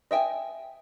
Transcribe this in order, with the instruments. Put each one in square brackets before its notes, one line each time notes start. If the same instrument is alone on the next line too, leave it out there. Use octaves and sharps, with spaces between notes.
[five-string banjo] D#5 E5 G5 G#5